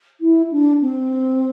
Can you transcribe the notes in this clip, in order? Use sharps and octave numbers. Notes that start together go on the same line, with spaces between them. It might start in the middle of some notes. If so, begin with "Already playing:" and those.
E4
D4
C4